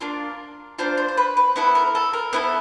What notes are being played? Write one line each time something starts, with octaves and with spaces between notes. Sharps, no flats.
A#3 D4 F4 A#4
A#3 D4 F4 C5
C5
C5
B4
B4
B3 E4 A4 B4
A#4
A4
A#4
B3 E4 A4 B4